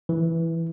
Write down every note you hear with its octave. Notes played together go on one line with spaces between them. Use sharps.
E3